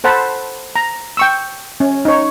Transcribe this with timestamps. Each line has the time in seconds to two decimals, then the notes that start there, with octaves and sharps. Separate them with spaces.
0.04 A4 C5 F#5 A5 B5
0.76 A#5
1.17 G5 C#6 E6
1.80 C#4
2.05 D#4 C#5